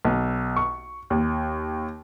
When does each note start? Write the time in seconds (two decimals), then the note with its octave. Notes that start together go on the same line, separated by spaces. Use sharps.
0.05 B1
0.57 C#6
1.10 D#2